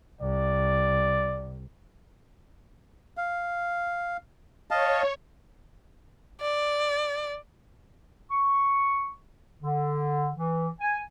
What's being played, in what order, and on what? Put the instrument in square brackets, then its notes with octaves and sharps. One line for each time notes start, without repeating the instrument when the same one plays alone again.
[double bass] C2 [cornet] D5
[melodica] F5
[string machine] C#5 [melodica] D#5 F5 A5
[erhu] D5
[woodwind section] C#6
D3
E3
G#5